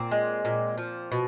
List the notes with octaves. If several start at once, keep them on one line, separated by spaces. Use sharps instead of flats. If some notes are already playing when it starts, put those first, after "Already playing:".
Already playing: A#2 C4
G#3
A#2
F3
B2